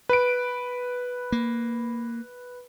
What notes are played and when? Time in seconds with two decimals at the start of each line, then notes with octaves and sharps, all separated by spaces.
0.09 B4 D7
1.32 A#3